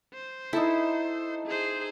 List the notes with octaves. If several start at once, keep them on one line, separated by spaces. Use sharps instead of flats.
C5
D#4 E4 A4
G#4 C5